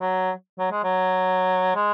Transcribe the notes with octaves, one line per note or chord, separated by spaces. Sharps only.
F#3
F#3
G#3
F#3
G#3